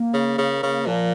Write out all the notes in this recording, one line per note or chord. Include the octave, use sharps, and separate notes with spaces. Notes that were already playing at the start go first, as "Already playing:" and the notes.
Already playing: A#3
C#3
C#3
C#3
A#2 F3